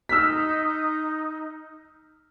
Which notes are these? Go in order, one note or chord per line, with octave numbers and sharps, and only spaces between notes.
D#4 E6 F6 B6